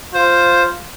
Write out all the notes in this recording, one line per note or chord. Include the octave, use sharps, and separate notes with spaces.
F4 C5